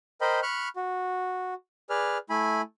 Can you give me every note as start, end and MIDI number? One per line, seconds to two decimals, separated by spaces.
0.21 0.40 70
0.21 0.40 72
0.21 0.40 75
0.21 0.40 79
0.21 0.40 83
0.43 0.68 83
0.43 0.68 85
0.43 0.68 89
0.43 0.68 90
0.76 1.54 66
1.90 2.18 68
1.90 2.18 71
1.90 2.18 74
1.90 2.18 89
2.30 2.62 57
2.30 2.62 64
2.30 2.62 80
2.30 2.62 83